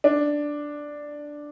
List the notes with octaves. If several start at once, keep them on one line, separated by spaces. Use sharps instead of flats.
D4